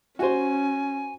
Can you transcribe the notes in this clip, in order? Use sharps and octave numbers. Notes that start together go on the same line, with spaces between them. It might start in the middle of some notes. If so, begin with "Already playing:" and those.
C#4 F#4 C5 G#5